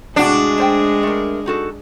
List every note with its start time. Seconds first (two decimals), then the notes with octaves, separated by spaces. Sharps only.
0.16 A2 C3 G#3 D4 F#4 G#4
0.58 A3 C5 G5
1.03 A3 A#4
1.46 D#4 F#4 A4